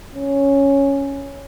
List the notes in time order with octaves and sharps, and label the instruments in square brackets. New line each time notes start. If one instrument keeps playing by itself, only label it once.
[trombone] C#4